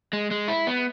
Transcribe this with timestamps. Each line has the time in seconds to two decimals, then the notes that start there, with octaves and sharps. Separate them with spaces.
0.13 G#3
0.31 G#3
0.48 E4
0.67 B3